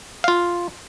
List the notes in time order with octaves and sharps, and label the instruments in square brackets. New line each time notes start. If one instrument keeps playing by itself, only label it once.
[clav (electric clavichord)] F4 F5